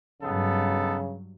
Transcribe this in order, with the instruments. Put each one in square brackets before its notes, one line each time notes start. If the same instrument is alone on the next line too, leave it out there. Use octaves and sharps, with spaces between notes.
[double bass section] G2 F#3 [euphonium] C#3 [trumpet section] B3 D#4 A4